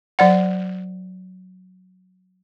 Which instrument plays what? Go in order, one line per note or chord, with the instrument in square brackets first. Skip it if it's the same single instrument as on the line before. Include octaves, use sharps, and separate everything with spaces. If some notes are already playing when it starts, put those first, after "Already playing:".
[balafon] F#3 D5 F#5